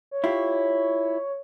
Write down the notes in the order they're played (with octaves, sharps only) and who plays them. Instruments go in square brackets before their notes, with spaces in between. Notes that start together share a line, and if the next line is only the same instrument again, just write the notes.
[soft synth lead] C#5
[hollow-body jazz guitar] E4 F4 G4